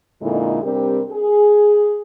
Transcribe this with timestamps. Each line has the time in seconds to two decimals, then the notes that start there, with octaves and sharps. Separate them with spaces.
0.22 F2 A#2 D3 G#3 D#4 E4
0.63 C3 G3 C4 D4 G4 A#4
1.10 G#4